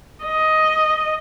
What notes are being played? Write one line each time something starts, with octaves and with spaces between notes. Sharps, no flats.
D#5